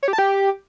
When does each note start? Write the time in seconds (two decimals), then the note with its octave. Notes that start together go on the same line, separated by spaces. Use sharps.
0.03 C#5
0.08 G4
0.13 A5
0.18 G4